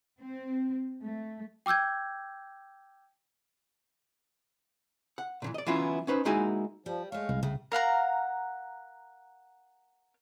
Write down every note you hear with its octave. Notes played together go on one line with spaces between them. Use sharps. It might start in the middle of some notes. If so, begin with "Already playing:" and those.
C4
A3
G5 D6 E6 G6 G#6
F#5
A#2 D3 E3
D5 D#5
E3 F#3 B3 C#4 E4 F4
C#4 D#4 B4 C5
G#3 A#3 D#4 E4 F#4 G#5
F3 G3
G#3 A3 C#5 F5
C2 B2
A2 C#3
A#4 F5 F#5 A#5